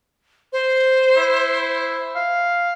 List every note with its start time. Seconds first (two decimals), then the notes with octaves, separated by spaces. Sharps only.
0.53 C5
1.17 E4
2.15 F5